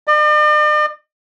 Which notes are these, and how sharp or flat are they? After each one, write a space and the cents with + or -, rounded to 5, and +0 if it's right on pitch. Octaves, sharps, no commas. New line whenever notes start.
D5 +45